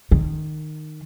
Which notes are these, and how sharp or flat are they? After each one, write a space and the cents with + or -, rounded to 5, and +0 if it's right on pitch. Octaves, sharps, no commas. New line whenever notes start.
D#3 -20